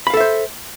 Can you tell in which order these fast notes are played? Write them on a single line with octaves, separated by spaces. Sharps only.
B5 F5 A4 E5 C5